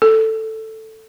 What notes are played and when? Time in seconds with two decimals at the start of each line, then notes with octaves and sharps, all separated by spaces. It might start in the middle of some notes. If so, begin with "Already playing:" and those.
0.02 A4